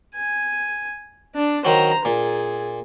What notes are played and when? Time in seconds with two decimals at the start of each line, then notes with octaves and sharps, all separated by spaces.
0.15 G#5
1.35 D4
1.65 D#3 F#3 C5 A#5
2.05 A#2 G#4